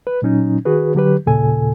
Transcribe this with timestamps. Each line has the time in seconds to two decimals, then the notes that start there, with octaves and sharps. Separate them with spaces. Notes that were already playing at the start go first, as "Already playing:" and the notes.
0.07 B4
0.22 A#2 F#3 C#4 D#4
0.65 D#3 F#4 G#4 B4
0.95 D3 F#3 G4 B4
1.26 D#2 A#2 C#3 A4 G#5